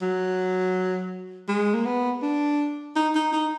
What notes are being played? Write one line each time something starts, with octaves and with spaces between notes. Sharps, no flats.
F#3
G#3
A#3
B3
D4
D#4
D#4
D#4